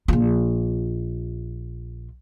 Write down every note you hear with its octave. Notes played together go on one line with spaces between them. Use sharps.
A#1 F4